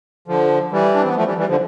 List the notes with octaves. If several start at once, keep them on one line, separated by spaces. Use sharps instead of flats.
D3 F3
E3 G3
D4
C4
B3
F3 A3
E3 G3
E3 G3
D3 F3